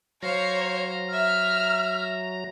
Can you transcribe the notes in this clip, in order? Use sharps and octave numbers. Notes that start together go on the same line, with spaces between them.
F#3 C5 C#5 F5 A#5
E5 F6